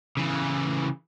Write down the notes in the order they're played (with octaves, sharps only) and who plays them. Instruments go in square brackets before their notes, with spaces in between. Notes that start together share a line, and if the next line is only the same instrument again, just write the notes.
[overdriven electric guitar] C#3 E3